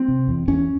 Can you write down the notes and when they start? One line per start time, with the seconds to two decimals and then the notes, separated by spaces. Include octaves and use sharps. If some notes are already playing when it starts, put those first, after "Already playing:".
Already playing: C4
0.08 C3
0.28 E2
0.48 E2 C#4